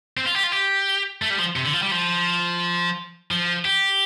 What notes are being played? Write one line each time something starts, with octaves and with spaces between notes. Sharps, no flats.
C4
F4
G4
F4
G4
A3
G3
F3
C3
D3
F3
G3
F3
F3
G4